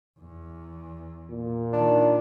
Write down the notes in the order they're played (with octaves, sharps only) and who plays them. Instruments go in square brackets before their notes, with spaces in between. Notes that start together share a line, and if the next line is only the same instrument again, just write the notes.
[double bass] E2
[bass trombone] A#2
[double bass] D#3 [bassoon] D4